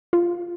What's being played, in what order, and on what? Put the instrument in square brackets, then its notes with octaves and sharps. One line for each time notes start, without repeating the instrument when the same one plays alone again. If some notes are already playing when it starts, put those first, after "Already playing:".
[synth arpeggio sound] F4